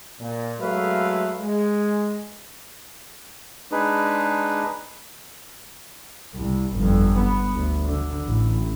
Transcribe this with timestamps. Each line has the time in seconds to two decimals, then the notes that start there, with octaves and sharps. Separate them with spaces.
0.19 A#2
0.60 F#3 G#3 A3 B4 E5 F5
1.40 G#3
3.72 G#3 D4 D#4 G#4 B4
6.35 C2
6.77 G1 F2
7.19 B3
7.52 D2
7.84 D3
8.24 A1